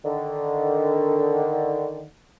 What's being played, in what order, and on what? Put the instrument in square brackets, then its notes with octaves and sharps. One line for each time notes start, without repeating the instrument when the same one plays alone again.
[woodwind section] D3 D#3